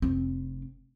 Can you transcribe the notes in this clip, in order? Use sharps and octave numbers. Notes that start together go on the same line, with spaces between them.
F1 C4